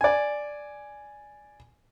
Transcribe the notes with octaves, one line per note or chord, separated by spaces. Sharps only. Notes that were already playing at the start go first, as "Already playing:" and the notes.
D5 G#5